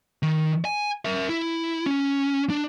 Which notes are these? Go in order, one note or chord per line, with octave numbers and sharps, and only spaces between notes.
D#3
G#5
A#4 E5
E4
C#4
D4